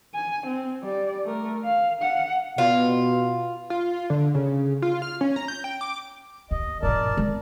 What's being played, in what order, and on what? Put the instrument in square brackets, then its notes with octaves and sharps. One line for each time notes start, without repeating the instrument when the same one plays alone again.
[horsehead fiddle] G#5
C4
G3 D5
A3 A#4
F5
F5 F#5
[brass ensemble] B2 [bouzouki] F4
[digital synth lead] F4
D3
C#3
F4
F6
C#4
A#5
G6
G5
D6
[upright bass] D#2 [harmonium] D#5
[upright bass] A#1 G2 [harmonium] A#4 D5 A5
[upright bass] G#3 C4